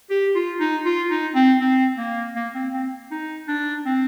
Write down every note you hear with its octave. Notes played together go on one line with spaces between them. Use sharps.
G4
F4
D#4
F4
D#4
C4
C4
A#3
A#3
C4
C4
D#4
D4
C4